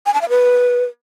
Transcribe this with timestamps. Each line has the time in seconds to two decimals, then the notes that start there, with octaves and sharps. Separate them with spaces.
0.06 G#5
0.14 A5
0.21 F5
0.29 B4